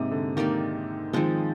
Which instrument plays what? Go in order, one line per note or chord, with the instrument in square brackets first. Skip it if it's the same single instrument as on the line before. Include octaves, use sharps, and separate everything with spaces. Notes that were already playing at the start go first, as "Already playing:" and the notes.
Already playing: [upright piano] G#2 C3 [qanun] A#3 D#4 G4
[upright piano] D3
[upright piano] D#3 [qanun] A#3 D#4 G4 D5
[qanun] D#3 G#3 C4 [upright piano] F3